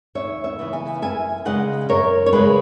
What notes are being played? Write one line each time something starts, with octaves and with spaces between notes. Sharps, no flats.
D#2 C#5 E5
C#5 E5
C#3 E3 B3
E5 G#5
F#2 E5 G#5
C#3 G#3 D#5 F#5
F#2 A#4 C#5
C#5
C#3 G#3 G#4 B4